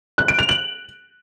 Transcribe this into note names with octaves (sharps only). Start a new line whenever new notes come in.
F#6
D7
F7
F#7